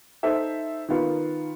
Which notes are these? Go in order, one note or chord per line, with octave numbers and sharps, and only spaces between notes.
D#4 A4 C5 E5
D#3 B3 F4 A#4